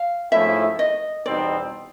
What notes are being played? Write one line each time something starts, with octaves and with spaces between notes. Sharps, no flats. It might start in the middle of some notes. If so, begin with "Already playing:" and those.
Already playing: F5
G#2 F3 A3 C#4 E4 E5
D#5
E2 B2 G3 C4 D#4 D5